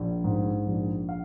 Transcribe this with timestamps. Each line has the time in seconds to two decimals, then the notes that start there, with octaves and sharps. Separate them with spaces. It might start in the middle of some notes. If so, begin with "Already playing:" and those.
Already playing: A#1
0.24 G#2
0.66 A#1
1.09 F5